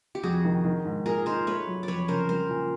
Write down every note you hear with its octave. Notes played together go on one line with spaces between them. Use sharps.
G4
F2 F#4 G#4
D#3
D#3
G#2
A#2 G#4 A#4
D#4 A#4 C5
A3 B4 C#5
F#3
D5
F2 B4 C#5
C#3 A#4 C5
G3 A#4 C5
A#2